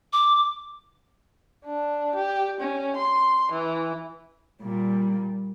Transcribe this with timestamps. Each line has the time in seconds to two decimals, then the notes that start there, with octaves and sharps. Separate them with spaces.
0.13 D6
1.65 D4
2.15 G4
2.61 C#4
2.97 C6
3.52 E3
4.62 A#2 G3